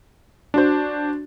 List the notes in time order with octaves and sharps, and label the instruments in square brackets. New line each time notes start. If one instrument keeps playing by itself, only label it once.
[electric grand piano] D4 F#4 C5